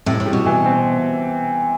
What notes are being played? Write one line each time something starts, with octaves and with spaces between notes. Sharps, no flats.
A2 C3
A2
G3
B2
E3
C4